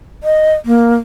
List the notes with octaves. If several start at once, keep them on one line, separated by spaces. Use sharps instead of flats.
D#5
A#3